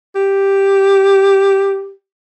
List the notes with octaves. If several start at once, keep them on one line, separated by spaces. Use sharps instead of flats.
G4